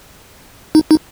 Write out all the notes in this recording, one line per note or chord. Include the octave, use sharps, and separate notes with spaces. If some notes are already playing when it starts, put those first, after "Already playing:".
D#4
D#4